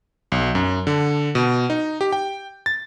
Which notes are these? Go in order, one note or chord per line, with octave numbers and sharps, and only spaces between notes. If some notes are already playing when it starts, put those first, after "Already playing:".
B1
F#2
D3
B2
D#4
G4
G5
A6